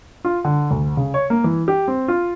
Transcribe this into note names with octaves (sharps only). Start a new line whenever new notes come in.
F4
D3
D2
C#3
C#5
A#3
E3
G4
C4
F4